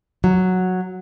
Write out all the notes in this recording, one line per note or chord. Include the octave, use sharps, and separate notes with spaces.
F#3